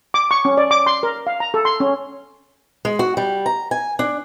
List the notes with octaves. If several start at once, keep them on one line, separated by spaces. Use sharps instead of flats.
D6
C#6
C#4
D5
D6
C6
A#4
F5
A#5
A4
C6
C#4
G#3
F#4
G3
A#5
G#5
D4